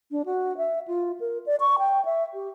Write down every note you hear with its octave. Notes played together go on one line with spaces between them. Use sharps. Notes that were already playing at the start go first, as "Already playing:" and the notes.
D4
F#4
E5
F4
A#4
D5
C#6
G5
E5
G4